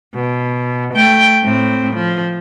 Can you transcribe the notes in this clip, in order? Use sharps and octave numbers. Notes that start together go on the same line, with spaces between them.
B2
A3 G5
A2 C4
F3